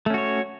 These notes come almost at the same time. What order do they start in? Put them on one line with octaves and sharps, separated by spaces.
A3 C#4 F#4 C#5